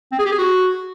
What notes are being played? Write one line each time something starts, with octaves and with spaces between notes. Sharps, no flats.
C4
G#4
G4
G#4
F#4